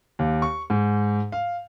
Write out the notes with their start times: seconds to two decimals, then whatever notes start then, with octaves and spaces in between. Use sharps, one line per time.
0.19 D#2
0.42 C#6
0.70 G#2
1.32 F5